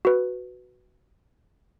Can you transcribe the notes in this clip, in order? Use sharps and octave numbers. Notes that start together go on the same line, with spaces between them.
F#4 B4